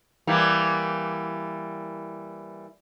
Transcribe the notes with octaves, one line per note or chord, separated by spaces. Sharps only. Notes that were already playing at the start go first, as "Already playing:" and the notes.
E3 G3 A#3